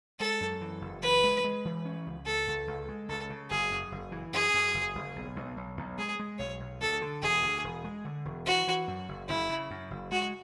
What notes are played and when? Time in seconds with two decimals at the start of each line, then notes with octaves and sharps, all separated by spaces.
0.20 G#3 A4
0.41 F#2
0.61 E3
0.81 F#1
1.02 E3 B4
1.24 G#3
1.44 G#3
1.65 E3
1.85 C#4
2.06 C#2
2.26 C#2 A4
2.47 C#2
2.67 C#2
2.88 G#3
3.09 C#2 A4
3.30 C#3
3.50 F#1 G#4
3.71 F#2
3.92 F#1
4.12 E3
4.33 F#2 G#4
4.54 F#2
4.74 F#1
4.95 F#1
5.16 B1
5.36 B1
5.57 B1
5.77 B1
5.98 G#3 G#4
6.19 G#3
6.39 B1 C#5
6.60 B1
6.80 D2 A4
7.01 D3
7.22 E1 G#4
7.43 D2
7.64 E1
7.84 G#3
8.05 D3
8.25 E1
8.46 E3 F#4
8.67 E3
8.88 F#2
9.08 F#1
9.29 F#1 E4
9.49 C#3
9.71 F#2
9.91 F#1
10.11 G#3 F#4